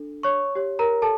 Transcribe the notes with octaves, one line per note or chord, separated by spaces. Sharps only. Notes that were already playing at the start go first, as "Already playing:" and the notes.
Already playing: D4 A4
C#5 C#6
G4 C#5
A#4 A#5
A4 A5